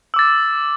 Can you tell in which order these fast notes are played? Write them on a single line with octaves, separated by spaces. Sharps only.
E6 D6 A6